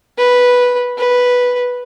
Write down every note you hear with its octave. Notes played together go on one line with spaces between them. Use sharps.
B4
B4